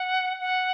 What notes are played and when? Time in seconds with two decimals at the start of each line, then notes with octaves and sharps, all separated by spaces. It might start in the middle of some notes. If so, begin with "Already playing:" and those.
Already playing: F#5
0.41 F#5